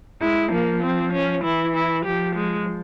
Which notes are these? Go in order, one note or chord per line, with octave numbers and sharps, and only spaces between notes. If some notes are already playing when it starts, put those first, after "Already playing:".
G#3 E4
F3 A#3
C4
C#4
E3 E4
E4
F3 G4
G#3